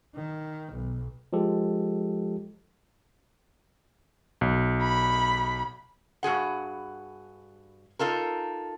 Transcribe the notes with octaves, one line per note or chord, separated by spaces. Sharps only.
D#3
B1
F3 G#3 G4 A4
B1
B5
G2 F#4 G#4 F#5
D#4 F4 A4 A#4